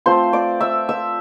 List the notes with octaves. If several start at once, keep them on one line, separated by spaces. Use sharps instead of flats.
A3 C4 F4 C5 C6
D5 D6
E5 E6
E5 E6